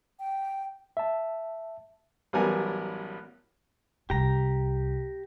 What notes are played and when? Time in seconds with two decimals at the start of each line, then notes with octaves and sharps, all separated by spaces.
0.20 G5
0.97 E5 A5
2.33 A1 F#3 G3 B3 A#4 G#5
4.10 C2 G4 A#5